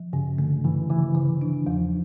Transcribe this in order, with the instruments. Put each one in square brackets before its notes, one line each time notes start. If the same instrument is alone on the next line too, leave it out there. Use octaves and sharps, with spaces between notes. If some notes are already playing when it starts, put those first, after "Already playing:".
Already playing: [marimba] F3
[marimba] G2 [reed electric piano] C#3
[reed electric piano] D3 [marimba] A3
[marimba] G2 [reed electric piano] E3
[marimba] C#3 [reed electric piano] E3
[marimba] C#3
D4
[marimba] E2 [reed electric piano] F3